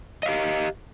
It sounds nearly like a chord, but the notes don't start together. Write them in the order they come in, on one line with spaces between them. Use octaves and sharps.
D#5 F5 G4